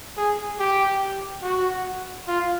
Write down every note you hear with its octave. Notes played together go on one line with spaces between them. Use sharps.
G#4
G4
F#4
F4